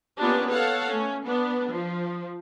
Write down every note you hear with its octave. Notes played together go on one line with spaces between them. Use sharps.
A#3 B3 C#4 D4 F4 G4
A4 C#5 F5 F#5
A3 C#4
B3 D4
F3